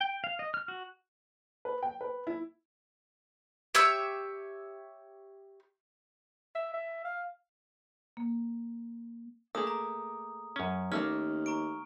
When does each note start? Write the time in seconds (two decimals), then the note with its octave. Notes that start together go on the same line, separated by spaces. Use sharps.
0.01 G5
0.24 F5
0.39 D#5
0.54 F6
0.68 F#4
1.65 B4
1.83 G5
2.01 B4
2.27 E4
3.75 G4 C#5 E5 E6
6.55 E5
6.73 E5
7.04 F5
8.17 A#3
9.55 A3 A#3 G#4 D#6
9.67 A#5
10.56 F#2 C#4
10.92 D#2 G3 A3 A#3 C#4 F6
11.46 A#5 C#6 D7